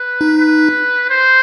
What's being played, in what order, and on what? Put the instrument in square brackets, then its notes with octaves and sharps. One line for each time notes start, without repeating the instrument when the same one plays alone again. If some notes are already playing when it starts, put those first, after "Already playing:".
Already playing: [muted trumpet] B4
[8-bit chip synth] D#4
[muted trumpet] B4
C5